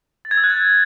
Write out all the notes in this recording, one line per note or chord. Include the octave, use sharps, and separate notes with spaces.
A6
G#6
E6
F#6
A6